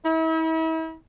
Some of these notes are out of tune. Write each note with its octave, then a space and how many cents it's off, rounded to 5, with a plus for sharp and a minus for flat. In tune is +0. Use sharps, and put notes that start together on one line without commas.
E4 -40